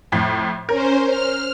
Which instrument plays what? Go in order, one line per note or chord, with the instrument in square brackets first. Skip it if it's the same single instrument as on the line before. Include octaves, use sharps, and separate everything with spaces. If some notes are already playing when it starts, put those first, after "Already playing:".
[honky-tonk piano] F2 A2
[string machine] C#4 C5 [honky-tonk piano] A#4
[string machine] F6